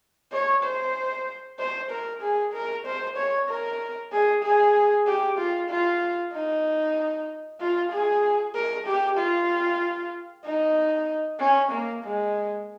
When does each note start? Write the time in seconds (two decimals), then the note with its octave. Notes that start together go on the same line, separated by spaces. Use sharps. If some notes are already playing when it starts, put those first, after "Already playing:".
0.32 C#5
0.64 C5
1.59 C5
1.91 A#4
2.22 G#4
2.53 A#4
2.85 C5
3.17 C#5
3.49 A#4
4.12 G#4
4.43 G#4
5.07 G4
5.38 F4
5.70 F4
6.33 D#4
7.61 F4
7.92 G#4
8.55 A#4
8.87 G4
9.18 F4
10.45 D#4
11.40 C#4
11.72 A#3
12.04 G#3